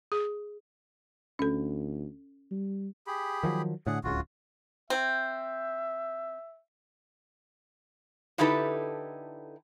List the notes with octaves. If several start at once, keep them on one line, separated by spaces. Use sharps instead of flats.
G#4
D2 C#4 A4
G3
G4 G#4 B5
D#3 F3 F#3
A2 D3 G#4 F#5
D1 C#2 C#3 F4 F#4
C4 E5
D3 D#4 E4 G4 A4 B4